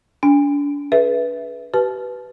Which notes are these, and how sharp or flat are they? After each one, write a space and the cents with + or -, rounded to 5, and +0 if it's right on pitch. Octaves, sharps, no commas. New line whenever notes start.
D4 -35 G#5 -40
G#4 +30 B4 -10 E5 +0
G4 -40 B4 +0 A5 -40